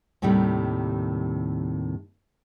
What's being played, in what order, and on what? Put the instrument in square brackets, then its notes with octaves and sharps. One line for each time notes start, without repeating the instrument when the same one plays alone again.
[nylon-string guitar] D#2 A2 C3 D#3 G3